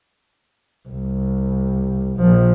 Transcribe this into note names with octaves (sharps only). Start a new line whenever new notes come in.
C2
A#1 F3